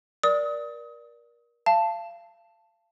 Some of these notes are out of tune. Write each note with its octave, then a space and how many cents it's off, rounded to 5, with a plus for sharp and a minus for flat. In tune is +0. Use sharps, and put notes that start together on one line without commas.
A#4 +30 D5 +0 D#6 +30
F5 -30 A5 +0